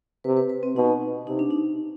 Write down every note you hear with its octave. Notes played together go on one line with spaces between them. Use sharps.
C3 B4
B4
B4
C4
B2 D#4
C3 D#4
D4
D#4